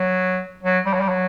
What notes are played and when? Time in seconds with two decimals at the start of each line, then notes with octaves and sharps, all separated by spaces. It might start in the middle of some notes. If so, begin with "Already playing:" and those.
Already playing: F#3
0.63 F#3
0.86 G3
0.94 F#3
1.01 G3
1.09 F#3